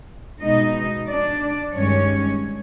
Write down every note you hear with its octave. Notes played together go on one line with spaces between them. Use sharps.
B2 G#3 D#4 D#5
D4 D5
G2 D#3 G#3 C#4 C#5